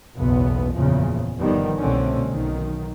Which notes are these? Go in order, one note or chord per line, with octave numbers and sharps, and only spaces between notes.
F#1 B1 E2 B3
F#1 E2 A#2 C#3 F3
G1 D#3 F3 G3 B3
C2 B2 D3 A3 C4 C#4
B1 D#3